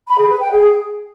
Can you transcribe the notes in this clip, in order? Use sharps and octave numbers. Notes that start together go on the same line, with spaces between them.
B5
G#4
B4
G5
G#4